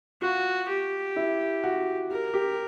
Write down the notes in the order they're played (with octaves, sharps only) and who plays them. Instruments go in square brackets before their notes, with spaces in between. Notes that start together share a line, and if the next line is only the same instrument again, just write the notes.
[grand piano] F4 [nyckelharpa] F#4
[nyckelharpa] G4
[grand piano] E4
F#4
[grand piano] G4 [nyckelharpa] A#4
[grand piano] G4